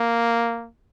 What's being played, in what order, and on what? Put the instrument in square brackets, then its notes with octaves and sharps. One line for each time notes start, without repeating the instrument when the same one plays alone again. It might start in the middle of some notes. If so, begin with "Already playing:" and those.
Already playing: [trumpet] A#3